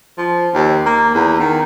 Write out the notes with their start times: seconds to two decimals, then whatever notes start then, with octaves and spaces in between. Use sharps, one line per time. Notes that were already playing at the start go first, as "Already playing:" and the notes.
0.18 F3
0.54 D#2
0.86 A#3
1.14 E2
1.40 D#3